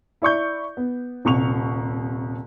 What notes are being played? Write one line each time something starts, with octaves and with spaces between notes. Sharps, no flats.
E4 D5 C#6 G6
B3
D#1 C2 C#6 F7